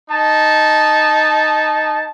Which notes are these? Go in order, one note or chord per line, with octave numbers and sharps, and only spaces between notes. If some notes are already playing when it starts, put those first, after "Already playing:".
D#4 A5